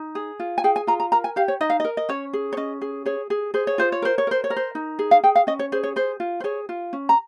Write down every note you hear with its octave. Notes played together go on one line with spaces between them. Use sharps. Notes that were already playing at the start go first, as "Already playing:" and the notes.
Already playing: D#4
G#4
F4
G#5
G#4 G5
G#5
F4 A#5
A#5
A#4 A#5
G#5
G4 F5
C#5
D#4 D#5
F5
D#5
A#4
D#5
C#4 C#5
G#4
C#5
C#4 D#5
G#4
G#4 C#5
G#4
G#4 C5
C#5
F4 C5
C#5
A#4 C5
C#5
A#4 C5
C#5
A#4
C5
D#4
G#4
F5
G#4 G5
F5
C#4 D#5
C#5
G#4 C5
C#5
G#4 C5
F4
C5
G#4 C#5
F4
C#4
A#5